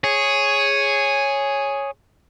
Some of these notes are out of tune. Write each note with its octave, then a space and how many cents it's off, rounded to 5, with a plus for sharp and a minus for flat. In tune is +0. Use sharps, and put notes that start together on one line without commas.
G#4 +0 C#5 +0